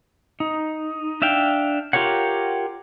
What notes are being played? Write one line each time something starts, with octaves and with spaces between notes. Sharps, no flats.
D#4
D4 E5 F5 G5
F4 G4 A#4 C#5 F#5